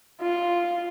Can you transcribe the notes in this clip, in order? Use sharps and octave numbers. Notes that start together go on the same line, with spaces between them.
F4